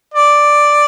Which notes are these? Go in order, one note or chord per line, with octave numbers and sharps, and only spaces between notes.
D5